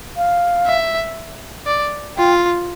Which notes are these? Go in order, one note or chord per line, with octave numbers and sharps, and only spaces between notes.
F5
E5
D5
F4 G5